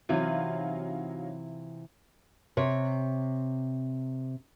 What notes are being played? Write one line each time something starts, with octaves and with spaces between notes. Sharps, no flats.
C3 E3 F#3 D#4 F4 F5
C3 C#5